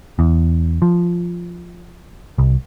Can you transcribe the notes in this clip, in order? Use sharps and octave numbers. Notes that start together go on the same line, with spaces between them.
E2
F3
C2